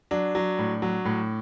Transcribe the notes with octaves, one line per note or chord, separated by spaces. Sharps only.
F#3 D4
F#3
A2
F#3
A2